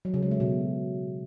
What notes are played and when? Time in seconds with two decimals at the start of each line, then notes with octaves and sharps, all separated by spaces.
0.05 F#3
0.14 C#3
0.22 G#3
0.31 A3
0.40 B2